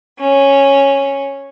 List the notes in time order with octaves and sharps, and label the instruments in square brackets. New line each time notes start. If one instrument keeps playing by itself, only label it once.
[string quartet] C#4